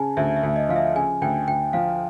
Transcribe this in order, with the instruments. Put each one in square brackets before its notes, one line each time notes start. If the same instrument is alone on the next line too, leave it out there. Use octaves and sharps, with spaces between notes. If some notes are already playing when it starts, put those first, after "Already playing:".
Already playing: [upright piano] C#3 [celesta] G#5 A5
[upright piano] D2 [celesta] E5
[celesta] E5
[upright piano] D2
[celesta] D#5
[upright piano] F3 [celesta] F5
[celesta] E5
[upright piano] C#3 [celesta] G#5
[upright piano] D2 [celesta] G5
[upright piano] D2 [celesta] G5
[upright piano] F3 [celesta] F5